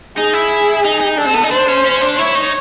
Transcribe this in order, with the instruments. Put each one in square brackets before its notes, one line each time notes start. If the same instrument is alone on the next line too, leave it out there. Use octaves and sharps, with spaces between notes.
[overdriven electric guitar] D#4 [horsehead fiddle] G#4
[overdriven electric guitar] E4
D#4
D#4
[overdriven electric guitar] D4 [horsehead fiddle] A4
[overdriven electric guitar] C4
B3
D#4
[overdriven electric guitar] D4 [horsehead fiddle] C5
[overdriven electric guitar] C#4
C#4
D4
[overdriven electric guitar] E4 [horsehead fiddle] C#5
[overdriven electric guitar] D#4